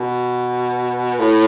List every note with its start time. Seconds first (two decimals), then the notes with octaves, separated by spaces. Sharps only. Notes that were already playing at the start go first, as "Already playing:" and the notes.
Already playing: B2
1.19 A2